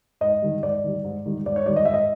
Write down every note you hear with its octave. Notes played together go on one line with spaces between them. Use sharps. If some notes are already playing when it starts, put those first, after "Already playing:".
G#2 D#5
D#3 G3
G#2 D5
D#3 G3
G#2
D#3 G3
G#2 D5
C#5
D#3 G3 D5
D#5
G#2 E5
D#5